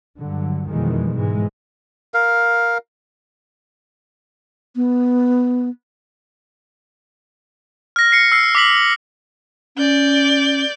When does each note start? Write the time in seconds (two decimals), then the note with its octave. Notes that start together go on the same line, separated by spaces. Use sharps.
0.17 G2 D3 F#3
0.69 F2 B2 D#3 E3 G3 G#3
1.16 G#2 E3 G#3
2.14 A#4 F5
4.76 B3
7.96 F6 A#6
8.12 C7 C#7
8.32 E6 C7
8.55 D6 B6 F#7
9.76 C#4 D5 G6